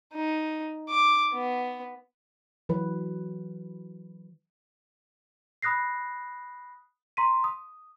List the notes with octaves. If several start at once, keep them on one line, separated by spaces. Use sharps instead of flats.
D#4
D6
B3
E3 F#3 B4
B5 D#6 F#6 A#6 C7
A#5 C6 B6 D#7
D#6